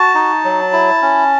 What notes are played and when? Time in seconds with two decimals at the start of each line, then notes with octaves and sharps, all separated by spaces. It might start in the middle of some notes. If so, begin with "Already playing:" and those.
Already playing: F#4 A5
0.15 D#4
0.45 F#3
0.73 E4
1.02 C#4